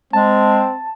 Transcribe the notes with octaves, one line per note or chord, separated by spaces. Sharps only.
G#3 C4 A5